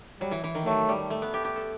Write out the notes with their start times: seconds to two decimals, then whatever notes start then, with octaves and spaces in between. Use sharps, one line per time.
0.20 F#3 G3
0.31 E3
0.44 E3
0.55 D#3
0.66 F#3 A3
0.89 G3
1.10 A3
1.22 B3
1.34 G4
1.44 G4
1.56 A4